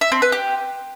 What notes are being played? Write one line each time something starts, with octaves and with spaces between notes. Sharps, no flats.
E5
C4
B4
G4